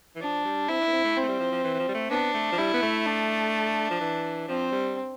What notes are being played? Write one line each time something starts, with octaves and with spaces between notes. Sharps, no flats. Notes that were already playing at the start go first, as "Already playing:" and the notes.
E3
F3 D4
G3
C4 E4
D4
B3
C4
A3
C4
A3
G3
F3
F3
E3
E3
F3
G3
A3
B3 D4
A3
F3
G3 E4
B3
A3
D4
F3
E3
F3 C4
G3